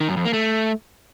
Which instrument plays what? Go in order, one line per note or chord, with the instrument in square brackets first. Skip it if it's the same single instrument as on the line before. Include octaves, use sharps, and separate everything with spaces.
[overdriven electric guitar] D#3
F#2
F2
A#3
A3